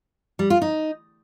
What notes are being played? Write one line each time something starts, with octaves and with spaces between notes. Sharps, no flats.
G3
F4
D#4